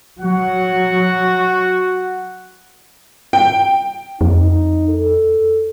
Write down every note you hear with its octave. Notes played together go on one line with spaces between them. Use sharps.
F#3 F#4 F#5
G5
F2 D#4
A4